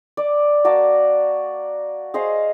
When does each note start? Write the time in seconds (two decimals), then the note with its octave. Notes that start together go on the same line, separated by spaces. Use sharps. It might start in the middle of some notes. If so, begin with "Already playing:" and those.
0.17 D5
0.64 A#3 F#4 D5 A5
2.14 G#4 C5 D#5 F5